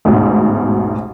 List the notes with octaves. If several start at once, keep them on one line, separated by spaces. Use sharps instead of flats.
A1 D2 G#2 B2